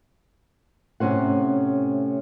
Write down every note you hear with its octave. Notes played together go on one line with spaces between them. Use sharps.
A2 C3 F#3 C#4 C5 F#5